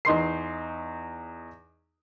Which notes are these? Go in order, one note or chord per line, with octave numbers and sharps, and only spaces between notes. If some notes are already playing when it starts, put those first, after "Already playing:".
E2 D#4 C6 C7